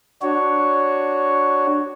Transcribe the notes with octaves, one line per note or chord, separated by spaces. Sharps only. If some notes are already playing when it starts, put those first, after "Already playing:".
D4 F#4 C#5